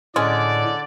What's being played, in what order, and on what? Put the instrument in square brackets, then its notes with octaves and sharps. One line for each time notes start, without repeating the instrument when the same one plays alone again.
[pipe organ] A2 [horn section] D3 D5 [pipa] G#3 C#4